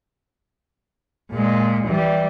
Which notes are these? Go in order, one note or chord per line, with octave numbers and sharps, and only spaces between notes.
A#2 G#3
E3 G3